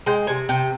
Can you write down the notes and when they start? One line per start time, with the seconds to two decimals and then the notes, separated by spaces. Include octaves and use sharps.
0.06 G#3 G5
0.27 C3 G#5
0.49 C3 G5